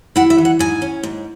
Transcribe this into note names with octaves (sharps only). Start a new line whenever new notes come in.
E4 F#5
E5
E3
F#5
G#2 G#5
C#4
G#2